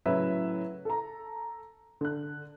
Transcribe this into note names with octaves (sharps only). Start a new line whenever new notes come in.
A2 C#3 F#3 E4 B4 E5
A4 A#5
D3 F#6